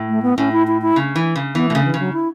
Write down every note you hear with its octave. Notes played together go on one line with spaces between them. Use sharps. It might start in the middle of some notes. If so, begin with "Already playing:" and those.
Already playing: A2
A3
B3
A2 C#4
E4
E4
E4
C#3
E3
C#3
E3 B3
B2 A3
C#3
E3
C#3
F#3
E4